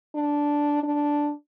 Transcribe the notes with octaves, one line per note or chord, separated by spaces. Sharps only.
D4
D4